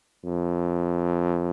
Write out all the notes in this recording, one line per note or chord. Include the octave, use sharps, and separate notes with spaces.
F2